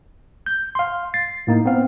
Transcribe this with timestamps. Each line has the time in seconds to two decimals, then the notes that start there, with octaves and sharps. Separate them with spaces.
0.46 G6
0.75 F5 C6
1.14 A6 C7
1.47 A2 A#3 D#4
1.65 B3 C4 F5